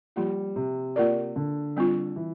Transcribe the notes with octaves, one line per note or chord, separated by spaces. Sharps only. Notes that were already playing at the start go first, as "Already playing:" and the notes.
F3 G3 A#3 F4
C3
A#3 F4 A#4 D5
D3
G3 C4 F4
E3